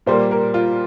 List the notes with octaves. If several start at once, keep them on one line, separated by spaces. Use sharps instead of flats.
A#2 G3 A#3 C5
A#4
F4